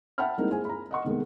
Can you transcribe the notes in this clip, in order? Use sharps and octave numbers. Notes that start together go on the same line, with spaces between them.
E5 F#5 G5 A5 B5 F6
G3 G#3 A#3 C4 D#4 E4
G#4 C5 G#5
A#5 B5
D#5 F#5 C#6
C3 D#3 G#3 A3 B3